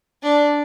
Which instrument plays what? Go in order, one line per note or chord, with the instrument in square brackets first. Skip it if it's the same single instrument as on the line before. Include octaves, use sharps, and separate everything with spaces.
[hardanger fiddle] D4